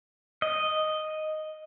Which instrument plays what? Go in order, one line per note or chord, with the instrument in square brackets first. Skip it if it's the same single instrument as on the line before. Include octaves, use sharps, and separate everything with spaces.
[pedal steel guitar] D#5